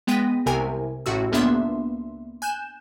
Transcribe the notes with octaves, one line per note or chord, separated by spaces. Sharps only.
G#3 B3 G5 A#6 B6 D#7
C2 C3 A#4 G#5
A1 A2 F#4 E6
C#2 A#3 B3 D4 E5 C6
G#5 F#6 G6 E7